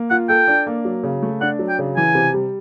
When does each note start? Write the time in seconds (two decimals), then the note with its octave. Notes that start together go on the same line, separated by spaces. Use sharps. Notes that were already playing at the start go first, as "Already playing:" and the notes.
Already playing: A#3
0.10 F4 F#5
0.29 A4 G5
0.48 D4
0.67 A#3
0.85 F#3
1.03 C#3
1.22 A3
1.41 D4 F#5
1.59 F#3
1.69 G5
1.79 C#3
1.96 E3 G#5
2.15 C3
2.34 G3